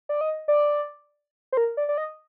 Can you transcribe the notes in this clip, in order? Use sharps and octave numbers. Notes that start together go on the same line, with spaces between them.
D5
D#5
D5
C5
A#4
D5
D5
D#5